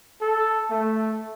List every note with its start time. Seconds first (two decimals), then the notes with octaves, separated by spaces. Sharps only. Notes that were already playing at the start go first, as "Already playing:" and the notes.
0.21 A4
0.70 A3